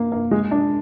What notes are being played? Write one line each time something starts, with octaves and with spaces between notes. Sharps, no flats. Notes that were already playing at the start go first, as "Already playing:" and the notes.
Already playing: A#3
A#3
G#3
D4